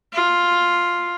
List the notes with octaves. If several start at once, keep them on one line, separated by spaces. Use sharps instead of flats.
F4